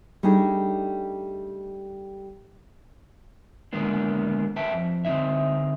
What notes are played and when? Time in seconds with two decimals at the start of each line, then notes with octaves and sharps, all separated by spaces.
0.23 G3 A3 D4 D#4 G#4
3.73 D3 D#3 G#3 A#3 B3 D4
4.56 A4 B4 E5 G5 A5
4.73 F2
5.05 D3 C4 D#4 E5